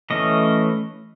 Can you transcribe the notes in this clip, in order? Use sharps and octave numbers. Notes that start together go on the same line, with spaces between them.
E3 A3 C#4 D#5